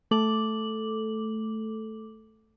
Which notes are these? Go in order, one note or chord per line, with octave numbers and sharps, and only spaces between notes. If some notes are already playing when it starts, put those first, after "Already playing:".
A3 A4 D6 F#7